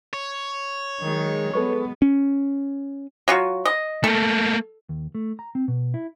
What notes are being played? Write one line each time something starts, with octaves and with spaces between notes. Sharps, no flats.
C#5
D#3 F#3 G#3
B3 A4 B4 C#6
C#4
F#3 F4 F#4
D#5
A3 A#3 A4
D#2
A3
A#5
C4
B2
E4